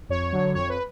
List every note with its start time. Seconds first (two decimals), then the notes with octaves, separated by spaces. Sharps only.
0.09 F2 C#5
0.32 D3 F#3
0.55 F2 C#5
0.69 B4